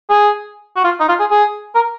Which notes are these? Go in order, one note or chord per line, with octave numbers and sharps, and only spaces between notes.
G#4
F#4
F4
D#4
F4
G#4
G#4
A#4